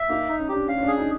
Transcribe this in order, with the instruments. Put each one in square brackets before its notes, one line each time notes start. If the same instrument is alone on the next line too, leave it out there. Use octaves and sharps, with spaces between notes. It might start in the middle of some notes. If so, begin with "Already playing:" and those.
Already playing: [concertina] E5
[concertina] A#3 [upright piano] D#4
[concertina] D#4
[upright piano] C#4
[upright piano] D4 [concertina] G4
[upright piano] C#4 [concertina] F5
[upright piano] C#4
D4
[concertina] G#4
[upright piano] D#4